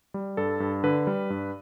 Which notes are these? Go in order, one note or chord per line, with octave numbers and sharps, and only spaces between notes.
G3
G2 A4
G2
D3 B4
G3
G2